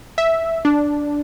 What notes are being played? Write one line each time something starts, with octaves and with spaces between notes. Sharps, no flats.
E5
D4